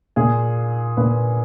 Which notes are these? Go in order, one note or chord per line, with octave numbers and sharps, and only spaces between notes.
A#2 G#4
A#2 B4